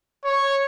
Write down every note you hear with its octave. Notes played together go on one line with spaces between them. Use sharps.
C#5